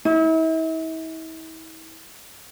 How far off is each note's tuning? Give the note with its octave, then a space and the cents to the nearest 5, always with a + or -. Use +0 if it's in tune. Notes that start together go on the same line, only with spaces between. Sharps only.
E4 -40